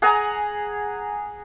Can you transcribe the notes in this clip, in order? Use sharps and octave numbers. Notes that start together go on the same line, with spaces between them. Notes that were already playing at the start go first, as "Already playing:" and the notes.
G#4 F#5 G#5 A#5